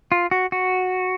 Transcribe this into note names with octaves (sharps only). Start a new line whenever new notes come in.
F4
F#4
F#4